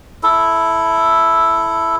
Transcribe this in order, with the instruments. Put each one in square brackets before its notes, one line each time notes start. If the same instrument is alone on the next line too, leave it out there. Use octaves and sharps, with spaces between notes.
[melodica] E4 A4